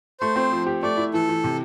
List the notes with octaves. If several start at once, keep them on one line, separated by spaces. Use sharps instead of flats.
A3 C5
C4
F3
G4
A3 D5
E4
E3 A4
E3
C3